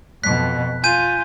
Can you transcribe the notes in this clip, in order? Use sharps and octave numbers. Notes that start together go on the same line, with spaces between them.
F2 B2 F#6 B6
F4 G#5 G6 D#7